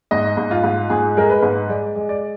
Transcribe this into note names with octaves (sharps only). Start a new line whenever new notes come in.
G#2 D#5
G#2
F4
G#2
G#2 G#4
G#3 A#4
B4
G#2
G#3 D5
G#3
D5